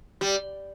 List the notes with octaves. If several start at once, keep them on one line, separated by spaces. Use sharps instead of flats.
G3